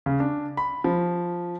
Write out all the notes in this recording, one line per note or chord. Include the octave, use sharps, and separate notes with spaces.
C#3
D4
B5
F3